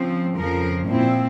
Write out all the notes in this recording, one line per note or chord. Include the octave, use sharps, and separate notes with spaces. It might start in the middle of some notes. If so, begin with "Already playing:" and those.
Already playing: C#3 F3 C4
F2 C#3 F3 A#4
A#2 F3 C4 E4